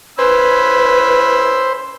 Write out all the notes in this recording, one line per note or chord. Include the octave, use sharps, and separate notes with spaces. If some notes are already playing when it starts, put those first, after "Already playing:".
C#4 B4 C5 B5 E6